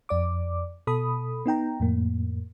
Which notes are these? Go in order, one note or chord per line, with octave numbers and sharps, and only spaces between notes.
F2 D5 D6
B2 A4 B5 D#6
B3 D#4 G5 A#5
F2 A2 A#3